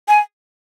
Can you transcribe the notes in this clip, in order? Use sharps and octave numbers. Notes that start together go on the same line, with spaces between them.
G#5